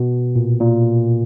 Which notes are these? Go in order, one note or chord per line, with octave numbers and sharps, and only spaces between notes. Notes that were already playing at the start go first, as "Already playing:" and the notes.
Already playing: B2
A#2
A#2